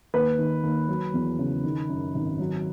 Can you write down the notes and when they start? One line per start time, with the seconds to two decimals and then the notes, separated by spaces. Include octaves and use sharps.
0.14 D#2 B4
0.38 D#3
0.63 D#2
0.89 F#3
1.14 E2
1.39 C#3
1.64 D#3
1.89 F#2
2.15 G#1
2.39 F#3